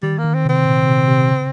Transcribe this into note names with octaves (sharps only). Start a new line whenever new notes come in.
D#3 G3
A#3
D#3
C4
C3 C4
A#2
C3
C3
C#3